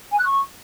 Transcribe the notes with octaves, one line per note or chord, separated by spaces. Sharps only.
G#5
F#6
C#6